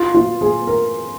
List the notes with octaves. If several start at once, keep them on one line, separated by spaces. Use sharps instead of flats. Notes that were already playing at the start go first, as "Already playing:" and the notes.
Already playing: F4
F4
G#4
A#4